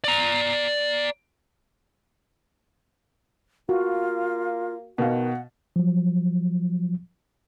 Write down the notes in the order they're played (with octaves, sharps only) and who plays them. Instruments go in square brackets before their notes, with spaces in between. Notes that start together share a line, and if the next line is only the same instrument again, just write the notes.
[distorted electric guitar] D5 A#5
[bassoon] A#3 [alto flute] F4 [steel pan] F#4
[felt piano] B2 F5 [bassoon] D#3 [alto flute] F#5
[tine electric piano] F3 F#3